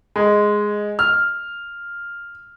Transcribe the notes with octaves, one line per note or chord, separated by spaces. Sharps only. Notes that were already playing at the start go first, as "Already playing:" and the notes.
G#3
F6